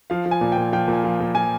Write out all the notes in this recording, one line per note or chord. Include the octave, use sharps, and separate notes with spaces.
F3 F5
F3
G#5
A#2
G5
A#2
F3 G5
A#2
G#5
F3
A#2
F3 G#5